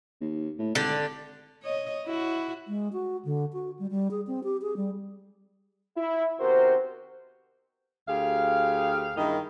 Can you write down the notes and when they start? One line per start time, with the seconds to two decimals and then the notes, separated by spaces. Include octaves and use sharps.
0.21 D#2
0.59 A2
0.75 G#1 D3 G4
1.63 C#5 D#5
2.06 E4 F#4
2.68 G#3
2.93 F#4
3.25 D3
3.53 F#4
3.79 G3
3.91 G3
4.11 G#4
4.27 C4
4.44 G4
4.62 G#4
4.77 G3
5.97 E4
6.40 C3 D#3 B3 F#4 A#4 C5
8.08 D2 G4 G#4 F5
9.16 G2 D#3 G#3 A#3 E4 D#5